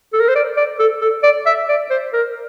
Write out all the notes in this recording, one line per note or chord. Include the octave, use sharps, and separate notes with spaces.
A4
A#4
C5
D5
D5
A4
A4
D5
E5
D5
C5
A#4